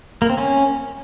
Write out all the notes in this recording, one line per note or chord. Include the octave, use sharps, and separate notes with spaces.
A#3
C4
C#4